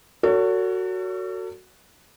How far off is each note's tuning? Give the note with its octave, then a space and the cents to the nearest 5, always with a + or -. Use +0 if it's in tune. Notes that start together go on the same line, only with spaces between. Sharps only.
F#4 +0 A4 +40 C#5 +35